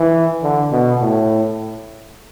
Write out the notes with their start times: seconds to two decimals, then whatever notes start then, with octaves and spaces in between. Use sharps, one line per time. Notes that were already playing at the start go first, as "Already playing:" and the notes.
Already playing: E3
0.43 D3
0.72 B2
1.01 A2